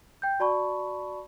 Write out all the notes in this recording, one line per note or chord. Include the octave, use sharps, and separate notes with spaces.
G5 G6
F#4 D5 A5 B5 C#6